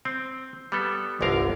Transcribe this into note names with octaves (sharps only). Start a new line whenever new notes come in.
C4
G3 B3 A4
G1 C2 D3 A#4 F5